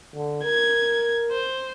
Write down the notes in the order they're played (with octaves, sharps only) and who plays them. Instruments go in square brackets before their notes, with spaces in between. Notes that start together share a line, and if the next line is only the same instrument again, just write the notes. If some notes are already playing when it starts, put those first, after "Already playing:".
[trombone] D3
[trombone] A#4 [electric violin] G#6
[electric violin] C5